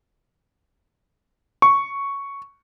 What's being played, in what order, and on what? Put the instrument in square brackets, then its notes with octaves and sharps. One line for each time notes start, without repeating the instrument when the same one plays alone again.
[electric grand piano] C#6